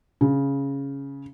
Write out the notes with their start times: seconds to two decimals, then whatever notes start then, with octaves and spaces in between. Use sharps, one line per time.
0.21 C#3